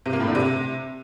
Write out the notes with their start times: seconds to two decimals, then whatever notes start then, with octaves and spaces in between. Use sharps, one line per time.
0.06 C3
0.13 A#3
0.20 A2
0.28 D3
0.35 C3